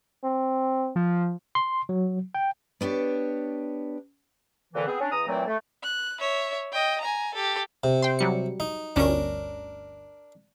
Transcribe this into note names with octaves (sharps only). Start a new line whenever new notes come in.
C4
F3
C6
F#3
G5
B3 D4 G4 C#5
F2 A#2 D3 E3
B3 C4 G#4
C#4 D4
E2 A#5 D#6
A#2 E3 F#3 A3 C4
A3
F#6
C#5 E5
D#5 G5
G#5 A#5
G4 A4
C3
G5 C6
F#3 G3 C#7
D#4
G1 D2 C#4 D4 A#4